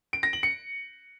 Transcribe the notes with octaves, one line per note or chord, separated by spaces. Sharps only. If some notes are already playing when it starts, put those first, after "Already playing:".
D7
A#6
F#7
C#7